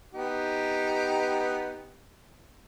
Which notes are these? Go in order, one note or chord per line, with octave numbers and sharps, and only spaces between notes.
B3 D#4 G4